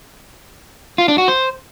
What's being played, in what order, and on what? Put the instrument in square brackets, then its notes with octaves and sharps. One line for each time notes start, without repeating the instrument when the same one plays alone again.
[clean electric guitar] F4
D4
F#4
C5